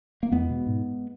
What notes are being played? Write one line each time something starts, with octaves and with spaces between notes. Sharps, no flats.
A#3
E2 G#3 B3
B2
G#2